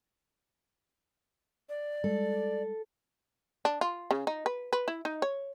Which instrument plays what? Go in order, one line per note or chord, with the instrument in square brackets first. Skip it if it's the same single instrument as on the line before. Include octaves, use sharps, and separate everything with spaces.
[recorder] D5
[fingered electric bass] G3 G#3 [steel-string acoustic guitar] A4
[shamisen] D4
F4
C#3
D#4
B4
B4
E4
D#4
C#5